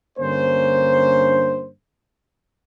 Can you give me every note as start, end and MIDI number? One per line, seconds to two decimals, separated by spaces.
0.19 1.68 43
0.19 1.68 50
0.19 1.68 58
0.19 1.68 61
0.19 1.68 72